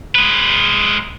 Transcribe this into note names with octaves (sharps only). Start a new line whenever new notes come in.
G#3 B4